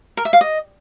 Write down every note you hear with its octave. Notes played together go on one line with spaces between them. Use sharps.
A#4
E5
F5
D#5